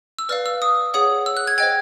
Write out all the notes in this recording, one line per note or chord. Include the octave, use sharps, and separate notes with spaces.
E6
B4 D5 F5 F6
E6
D#6
G#4 C#5 F#5 D#6
E6
F#6
G#6
C5 D#5 G5 G#6